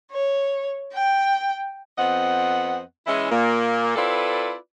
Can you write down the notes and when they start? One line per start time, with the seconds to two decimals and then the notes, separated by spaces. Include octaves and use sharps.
0.11 C#5
0.94 G5
1.98 F2 B3 C4 D#5 F#5
3.06 E3 G#3 C#4 E4 D#5 E5
3.30 A#2 A#3
3.96 C4 E4 F4 A4 B4 D5